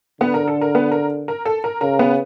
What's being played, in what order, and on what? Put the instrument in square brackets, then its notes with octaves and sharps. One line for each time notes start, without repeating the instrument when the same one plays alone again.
[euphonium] D3 [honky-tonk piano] B3 B4
[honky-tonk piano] A#4
A4
A#4
B3 B4
A#4
A#4
A4
A#4
[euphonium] C#3 [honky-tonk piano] A#4
[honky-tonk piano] B3 B4